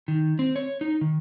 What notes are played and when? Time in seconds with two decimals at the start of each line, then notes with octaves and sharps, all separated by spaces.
0.08 D#3
0.39 C4
0.56 C#5
0.81 D#4
1.01 D#3